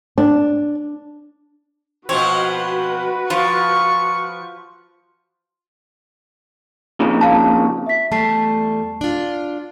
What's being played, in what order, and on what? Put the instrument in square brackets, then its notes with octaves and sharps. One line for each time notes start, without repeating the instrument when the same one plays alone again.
[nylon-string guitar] D4
[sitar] B2 F3 C4 [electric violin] F#4 B4 [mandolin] C#5
[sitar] F3 [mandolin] F4 [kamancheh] C#6
[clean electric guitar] F2 A#2 C#3
[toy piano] F5 A5
[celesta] E5 B6
[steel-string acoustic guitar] E2 G3 A3 [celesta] A5 C7
[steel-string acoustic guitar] D4 F4